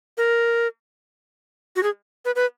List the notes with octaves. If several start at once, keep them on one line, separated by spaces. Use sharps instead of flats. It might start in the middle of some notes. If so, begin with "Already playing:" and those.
A#4
F#4
G#4
B4
B4